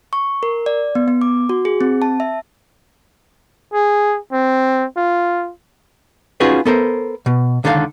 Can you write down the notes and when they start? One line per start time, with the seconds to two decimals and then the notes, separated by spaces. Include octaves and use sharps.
0.13 C#6
0.43 A#4
0.66 D5
0.95 B3
1.08 B3
1.21 D6
1.49 F#4
1.65 G#4
1.81 C4
2.02 A5
2.20 E5
3.73 G#4
4.33 C4
4.97 F4
6.40 C#4 D#4 F4 F#4 G#4 B4
6.66 B3 A4 A#4 C5
7.26 B2
7.64 C#2 D3 D#3 A4 A#4 F5